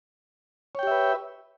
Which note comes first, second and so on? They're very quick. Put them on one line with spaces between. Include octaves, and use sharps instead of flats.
C#5 G5 G4 E5 B4